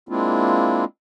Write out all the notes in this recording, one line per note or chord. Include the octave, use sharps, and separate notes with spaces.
G#3 A#3 C4 D4 E4 F4